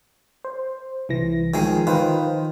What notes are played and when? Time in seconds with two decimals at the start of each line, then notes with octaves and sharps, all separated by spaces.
0.45 C5
1.09 C2 E3 A#6
1.54 D#3 F3 G#3
1.87 D#3 F4 B4 C5